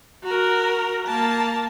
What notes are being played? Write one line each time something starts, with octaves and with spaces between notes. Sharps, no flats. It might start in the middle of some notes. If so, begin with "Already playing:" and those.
F#4 A#4
A#3 A5